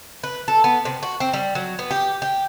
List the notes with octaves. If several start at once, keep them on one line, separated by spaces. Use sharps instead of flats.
B4
A4
B3
C3
F#4
C4
G3
F#3
B3
G4
G4